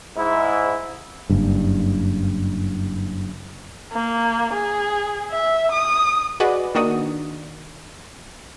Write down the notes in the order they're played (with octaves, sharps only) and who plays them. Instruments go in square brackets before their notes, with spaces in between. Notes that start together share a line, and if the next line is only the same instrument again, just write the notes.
[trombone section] G#2 E4
[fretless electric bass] F#1 G2
[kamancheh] A#3
G#4
E5
D#6
[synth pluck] F#4 G#4 B4 D5 D#5
D#3 A#3 D4 D#4 F#4 D#6